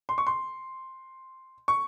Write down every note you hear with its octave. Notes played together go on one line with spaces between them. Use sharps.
C6
C#6
C6
C#6